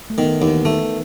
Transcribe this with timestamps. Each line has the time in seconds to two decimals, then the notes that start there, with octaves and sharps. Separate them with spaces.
0.10 A3
0.18 D#3 B3
0.41 D#2 E3
0.65 D#3 A3